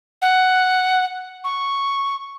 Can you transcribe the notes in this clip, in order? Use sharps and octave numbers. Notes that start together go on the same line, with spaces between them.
F#5
C#6